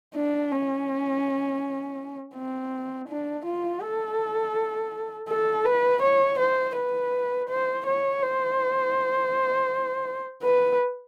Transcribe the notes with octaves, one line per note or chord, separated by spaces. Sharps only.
D4
C#4
C4
D4
F4
A4
A4
B4
C#5
C5
B4
C5
C#5
C5
B4